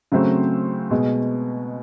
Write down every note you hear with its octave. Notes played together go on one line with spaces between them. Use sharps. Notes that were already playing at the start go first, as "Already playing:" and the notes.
C#3 F#3 A3 C4
B2 G#3 B3